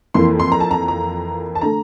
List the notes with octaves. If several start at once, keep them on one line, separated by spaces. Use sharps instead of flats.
F2 E3 A#3 C6
C6
A#5
A5
A#5
A#5
A5
D3 A3 A#5